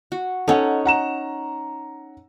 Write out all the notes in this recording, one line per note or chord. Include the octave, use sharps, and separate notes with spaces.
F#4
C#4 D#4 A4 F#5
F#5 A#5 E7